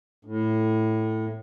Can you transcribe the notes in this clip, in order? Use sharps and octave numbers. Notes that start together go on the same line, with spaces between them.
A2